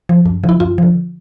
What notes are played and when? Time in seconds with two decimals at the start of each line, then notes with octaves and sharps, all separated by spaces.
0.09 F3
0.26 F#2
0.44 D3 F3
0.49 E4
0.60 F#2 F4
0.78 D3 F3